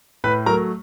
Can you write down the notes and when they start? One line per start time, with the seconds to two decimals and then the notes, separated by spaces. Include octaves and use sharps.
0.24 A2 B4 B5
0.46 F#3 A#4 A#5
0.50 A3